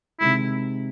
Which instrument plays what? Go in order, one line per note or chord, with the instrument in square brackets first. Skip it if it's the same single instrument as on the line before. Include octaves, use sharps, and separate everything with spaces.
[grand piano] C3 D#3 G#3 [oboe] E4